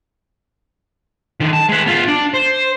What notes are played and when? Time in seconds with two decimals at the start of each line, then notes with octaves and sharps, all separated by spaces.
1.40 D3 D#3
1.53 A5
1.69 G#3 B4
1.86 B3 F4
2.08 D4
2.34 C5